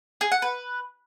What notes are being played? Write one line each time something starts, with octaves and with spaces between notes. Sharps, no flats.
G#4
F#5
B4